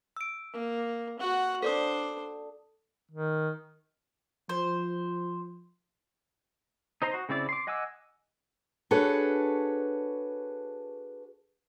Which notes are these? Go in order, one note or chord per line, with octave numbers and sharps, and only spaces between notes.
E6 D7
A#3
F#4 F#5
D4 A4 C5 D5 D#6
D#3
F3 C5
D#4 C5 A#5 C6
F#4
C#3 C4 E4 D5
C6 D6
D#5 F#5 G#5 D6 E6
D4 F#4 G#4 A4 B4 C#5